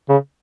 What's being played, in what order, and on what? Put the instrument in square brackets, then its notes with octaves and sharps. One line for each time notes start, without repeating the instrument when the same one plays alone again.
[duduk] C#3